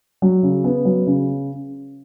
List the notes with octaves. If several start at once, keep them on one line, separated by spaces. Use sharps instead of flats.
F#3
C#3
B3
F#3
C#3